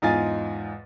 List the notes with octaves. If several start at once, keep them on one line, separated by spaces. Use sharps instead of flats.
E2 G#2 F4 D#5 G#5 A6